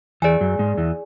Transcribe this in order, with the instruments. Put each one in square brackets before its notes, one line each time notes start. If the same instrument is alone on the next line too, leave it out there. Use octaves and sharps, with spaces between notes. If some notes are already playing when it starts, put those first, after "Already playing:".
[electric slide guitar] E2 E3 [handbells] G#4 D5 G#5
[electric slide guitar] F#2 F#3
G#2 G#3
E2 E3